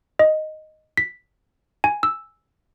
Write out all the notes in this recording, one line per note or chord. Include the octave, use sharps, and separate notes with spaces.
D#5
B6
G#5
E6